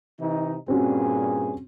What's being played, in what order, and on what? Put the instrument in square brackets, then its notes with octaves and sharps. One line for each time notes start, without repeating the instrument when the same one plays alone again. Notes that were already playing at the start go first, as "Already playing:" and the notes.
[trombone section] C3 E3 D#4
[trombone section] G2 A#2 G#4 [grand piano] C4 C#4 F#4